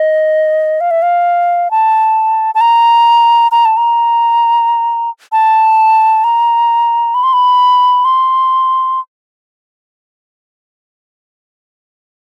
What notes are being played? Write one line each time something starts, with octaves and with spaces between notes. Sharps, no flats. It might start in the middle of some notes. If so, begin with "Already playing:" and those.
Already playing: D#5
F5
E5
F5
A5
A5
A#5
A#5
A5
A#5
A5
A#5
B5
C6
B5
C6